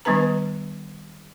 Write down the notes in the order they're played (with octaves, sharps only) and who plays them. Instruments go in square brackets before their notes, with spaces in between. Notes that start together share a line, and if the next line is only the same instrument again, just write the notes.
[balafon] D#3 G3 B3 D4 B4 A#5